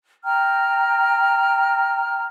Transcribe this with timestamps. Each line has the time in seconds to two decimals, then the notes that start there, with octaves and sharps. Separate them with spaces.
0.24 G5 A#5 F6